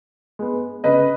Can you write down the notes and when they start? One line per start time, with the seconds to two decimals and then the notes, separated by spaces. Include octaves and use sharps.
0.39 G#3 B3
0.84 C#3 B4 D#5